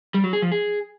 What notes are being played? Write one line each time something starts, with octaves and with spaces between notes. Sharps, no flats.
G3
F#3
G#4
F3
G#4